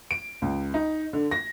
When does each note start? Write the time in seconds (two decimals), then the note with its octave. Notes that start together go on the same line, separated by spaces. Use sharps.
0.11 D7
0.42 C#2
0.74 D#4
1.13 D3
1.31 A#6